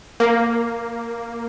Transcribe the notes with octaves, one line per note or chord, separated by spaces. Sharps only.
A#3